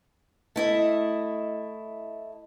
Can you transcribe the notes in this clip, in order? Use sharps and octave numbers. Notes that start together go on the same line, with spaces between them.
A3 E4 D#5